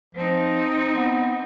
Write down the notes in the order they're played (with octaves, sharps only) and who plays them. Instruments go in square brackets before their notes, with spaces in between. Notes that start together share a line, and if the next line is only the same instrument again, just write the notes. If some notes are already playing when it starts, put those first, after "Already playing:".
[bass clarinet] F3 [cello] C4 D#4
[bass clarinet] B3